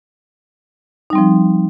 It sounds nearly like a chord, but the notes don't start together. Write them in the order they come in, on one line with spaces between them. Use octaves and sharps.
D#4 G3 C4 F3